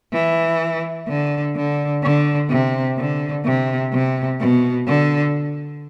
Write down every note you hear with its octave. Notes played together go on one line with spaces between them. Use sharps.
E3
D3
D3
D3
C3
D3
C3
C3
B2
D3